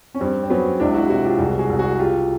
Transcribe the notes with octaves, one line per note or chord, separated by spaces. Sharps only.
C#4
G2 C4
C4
F#3 B3 C#4
C#2 D4 E4
E4 F#4
C3 E4 F#4
F4 G4
C2 F#4 G#4
F#4 G#4
C2
F#4 G#4
C#3 F4 G4